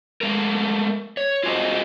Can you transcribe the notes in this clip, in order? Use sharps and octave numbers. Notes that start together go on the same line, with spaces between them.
G#3 A3 A#4
C#5
F4 F#4 G#4 A4 C5 D#5